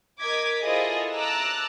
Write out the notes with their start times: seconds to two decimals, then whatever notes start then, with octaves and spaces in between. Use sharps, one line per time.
0.20 A#4 D#5 D6 G#6 B6
0.63 E4 F4 G#4 A4 C5 D#5
1.15 A5 A#5 D6 E6 F#6